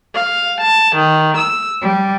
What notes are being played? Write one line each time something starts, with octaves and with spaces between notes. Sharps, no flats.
F5
A5
D#3
E6
G3